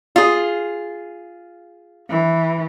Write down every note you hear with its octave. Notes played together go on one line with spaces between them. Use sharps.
F4 G#4
E3